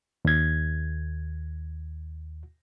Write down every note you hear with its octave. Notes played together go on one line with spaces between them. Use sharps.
D#2 G#6